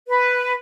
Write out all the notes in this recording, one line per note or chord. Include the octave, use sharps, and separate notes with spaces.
B4